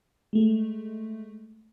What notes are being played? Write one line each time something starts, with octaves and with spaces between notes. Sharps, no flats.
G#3 A3